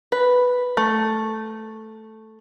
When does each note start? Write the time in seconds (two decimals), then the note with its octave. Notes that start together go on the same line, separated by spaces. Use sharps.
0.12 B4
0.77 A3